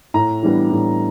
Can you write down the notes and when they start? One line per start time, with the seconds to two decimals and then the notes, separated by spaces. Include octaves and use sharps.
0.14 A2 A#5
0.43 E3 G3 B3 D4
0.71 A2